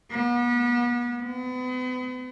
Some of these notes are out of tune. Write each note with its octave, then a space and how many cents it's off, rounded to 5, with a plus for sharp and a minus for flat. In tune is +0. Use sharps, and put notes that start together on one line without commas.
B3 -35
B3 +40